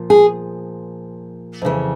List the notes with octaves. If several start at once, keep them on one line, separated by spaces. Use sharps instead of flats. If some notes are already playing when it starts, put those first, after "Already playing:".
Already playing: A#2 F3
G#4
F2 C#3 E3